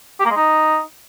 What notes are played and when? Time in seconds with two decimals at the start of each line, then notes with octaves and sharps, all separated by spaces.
0.20 G4
0.25 A#3
0.31 G#3
0.36 D#4